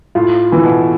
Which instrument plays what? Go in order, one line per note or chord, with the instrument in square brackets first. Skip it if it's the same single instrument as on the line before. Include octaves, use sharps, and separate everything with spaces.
[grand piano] A2 [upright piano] F4
[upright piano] E3
[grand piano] B2